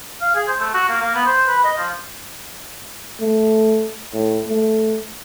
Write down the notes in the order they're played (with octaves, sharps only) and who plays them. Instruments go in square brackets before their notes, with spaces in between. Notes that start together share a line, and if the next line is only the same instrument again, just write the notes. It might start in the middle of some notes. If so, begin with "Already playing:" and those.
[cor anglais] F5
G#4
C5
A3
F#4
A#3
A#3
B3
C5
B4
D#5
F3
[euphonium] A3
A2
A3